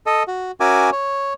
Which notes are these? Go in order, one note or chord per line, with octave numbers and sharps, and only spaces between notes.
A4 D#5
F#4
C#4 F#4 A#4 E5 G#5 D6
C#5